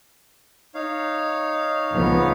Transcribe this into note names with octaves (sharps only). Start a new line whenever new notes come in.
D#4 C#5 F5
C#2 F3 B3